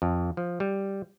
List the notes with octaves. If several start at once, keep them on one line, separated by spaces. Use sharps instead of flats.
F2
F3
G3